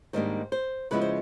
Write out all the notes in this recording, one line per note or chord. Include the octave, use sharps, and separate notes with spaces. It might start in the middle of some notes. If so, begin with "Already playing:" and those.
G#2 D#3 G3 A#3 D4 C5
C5
C#3 F3 G#3 B3 E4 B4
C5